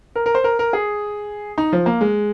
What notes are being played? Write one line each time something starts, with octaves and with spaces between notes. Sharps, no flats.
A#4
A#4
C5
A#4
A#4
G#4
D#4
F3
A#3
G#3